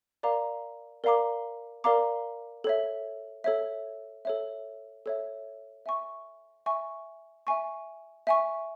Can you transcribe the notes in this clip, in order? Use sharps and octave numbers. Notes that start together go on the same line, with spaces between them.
A#4 D5 F5 A#5 D6
A#4 D5 F5 A#5 D6
A#4 D5 F5 A#5 D6
A4 C#5 E5
A4 C#5 E5
A4 C#5 E5
A4 C#5 E5
E5 G#5 C#6
E5 G#5 C#6
E5 G#5 C#6
E5 G#5 C#6